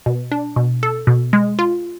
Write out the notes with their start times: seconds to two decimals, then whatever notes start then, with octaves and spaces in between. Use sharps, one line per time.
0.06 B2
0.32 D4
0.56 B2
0.83 A4
1.07 B2
1.33 G#3
1.59 F4